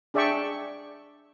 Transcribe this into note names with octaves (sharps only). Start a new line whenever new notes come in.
D4 G#4 D5 E5 G5 C#6